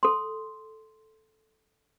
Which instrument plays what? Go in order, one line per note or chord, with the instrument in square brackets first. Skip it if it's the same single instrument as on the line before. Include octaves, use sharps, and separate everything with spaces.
[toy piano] A4 C6